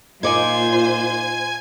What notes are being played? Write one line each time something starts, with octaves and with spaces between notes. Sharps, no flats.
A#2 D#4 F4 C5 D5 G#5 G#6